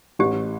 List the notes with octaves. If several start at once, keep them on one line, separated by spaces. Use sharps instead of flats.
A1 G4